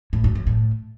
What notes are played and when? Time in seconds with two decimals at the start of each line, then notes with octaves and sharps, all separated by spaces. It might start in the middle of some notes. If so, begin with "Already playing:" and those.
0.13 A2
0.24 F#2
0.35 F#2
0.47 A2